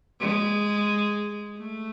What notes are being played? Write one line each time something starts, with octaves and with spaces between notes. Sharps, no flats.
G#3
A3